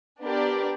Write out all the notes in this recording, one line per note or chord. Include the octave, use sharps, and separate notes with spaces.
B3 D4 G4 A#4 D5